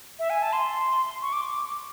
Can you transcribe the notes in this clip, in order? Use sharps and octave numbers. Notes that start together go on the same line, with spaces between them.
E5
G#5
A5
C6
C#6
D6
D6